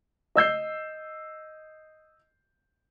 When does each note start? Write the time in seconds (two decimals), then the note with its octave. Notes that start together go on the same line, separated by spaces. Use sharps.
0.35 D#5 E6 G6 C7